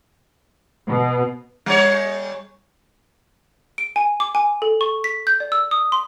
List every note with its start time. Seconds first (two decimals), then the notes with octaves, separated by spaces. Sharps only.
0.89 B2
1.66 G3 C#5
3.78 D7
3.96 G#5
4.20 D6
4.35 G#5
4.62 A4
4.81 C#6
5.04 B6
5.27 G6
5.40 D5
5.52 E6
5.71 D#6
5.92 C6